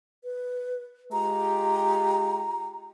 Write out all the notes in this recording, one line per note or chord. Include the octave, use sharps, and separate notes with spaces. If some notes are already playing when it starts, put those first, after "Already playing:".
B4
G#3 F4 G4 A#5